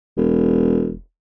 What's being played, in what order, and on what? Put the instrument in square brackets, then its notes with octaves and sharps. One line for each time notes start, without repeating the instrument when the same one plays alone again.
[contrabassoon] E1